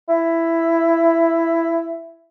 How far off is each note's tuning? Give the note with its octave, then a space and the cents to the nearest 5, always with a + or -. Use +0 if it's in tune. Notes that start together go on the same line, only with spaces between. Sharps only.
E4 +10